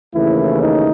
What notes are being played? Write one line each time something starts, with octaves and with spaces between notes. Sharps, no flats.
D#2 C#3 E3 A3 E4
D#4